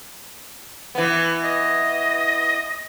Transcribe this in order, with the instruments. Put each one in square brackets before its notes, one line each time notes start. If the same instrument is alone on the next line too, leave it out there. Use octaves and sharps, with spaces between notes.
[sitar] E3 B3
[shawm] D#5